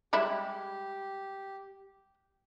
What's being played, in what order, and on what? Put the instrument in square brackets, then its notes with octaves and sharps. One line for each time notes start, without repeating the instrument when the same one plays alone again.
[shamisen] G3 G#3 E4 [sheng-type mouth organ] G4